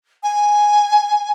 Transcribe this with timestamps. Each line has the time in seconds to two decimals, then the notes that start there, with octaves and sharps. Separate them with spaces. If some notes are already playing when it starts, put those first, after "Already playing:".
0.23 G#5